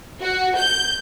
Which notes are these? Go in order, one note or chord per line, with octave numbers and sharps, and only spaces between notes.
F#4
G6